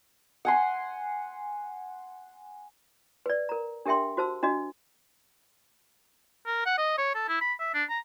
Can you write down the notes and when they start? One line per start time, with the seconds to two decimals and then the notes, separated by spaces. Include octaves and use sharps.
0.45 F#5 G#5 C6
3.26 B4 D5
3.49 A#4 A#5
3.86 D4 G4 A#4 E5 G5 C6
4.17 F#4 C5 A5 E6
4.43 D4 F#4 D#5
6.46 A#4
6.66 F#5
6.78 D#5
6.98 C#5
7.15 A4
7.28 E4
7.41 B5
7.60 E5
7.74 D4
7.90 A#5